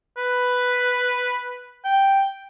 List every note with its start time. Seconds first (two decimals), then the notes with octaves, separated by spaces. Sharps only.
0.17 B4
1.84 G5